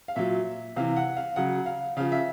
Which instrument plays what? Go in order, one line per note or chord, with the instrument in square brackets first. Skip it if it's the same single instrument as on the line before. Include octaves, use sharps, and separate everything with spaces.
[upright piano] F5
A#2 F#3 E5
C3 E3 F5
F#5
F5
C#3 F#3 F#5
F5
C#3 F3 F5
E5